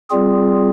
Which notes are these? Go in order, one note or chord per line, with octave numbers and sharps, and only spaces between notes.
G3 C4 F4 G#4